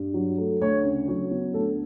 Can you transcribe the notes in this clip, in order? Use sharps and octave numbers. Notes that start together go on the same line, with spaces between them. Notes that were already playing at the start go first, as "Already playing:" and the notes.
Already playing: G2
F#3
A3
D2 C#5
C#3
F#3 C#5
B3
D2 A4